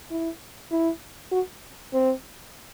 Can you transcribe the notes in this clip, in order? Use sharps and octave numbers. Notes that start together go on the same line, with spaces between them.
E4
E4
F#4
C4